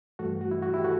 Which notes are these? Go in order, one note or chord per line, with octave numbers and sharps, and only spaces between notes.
G2 E3 A3 F#4 A4
F#4
E4
F#4
E4 G4
F#4 A4